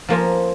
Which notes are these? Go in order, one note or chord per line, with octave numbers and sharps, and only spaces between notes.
F3 A#3 C#4 F4